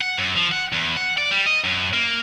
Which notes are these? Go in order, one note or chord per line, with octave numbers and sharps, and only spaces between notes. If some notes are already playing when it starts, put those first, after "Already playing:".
F#5
F#2
F3
F#5
E2
F#5
D5
G3
D#5
F#2
A#3